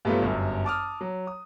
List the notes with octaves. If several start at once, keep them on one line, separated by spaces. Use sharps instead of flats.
G2 F#3 A3 B3 F4
G1 F#2
A5 D6 D#6 F6
F#3
D#6